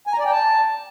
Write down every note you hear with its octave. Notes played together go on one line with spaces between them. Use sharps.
G#5
A#5
D5
G5
A5